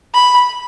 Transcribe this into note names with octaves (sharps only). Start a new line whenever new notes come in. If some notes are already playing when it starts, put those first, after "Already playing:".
B5